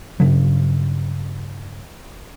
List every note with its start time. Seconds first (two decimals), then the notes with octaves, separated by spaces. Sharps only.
0.20 G2 C#3 F#3